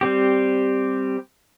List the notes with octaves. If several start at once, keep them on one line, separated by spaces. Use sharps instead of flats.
G3 C4 G4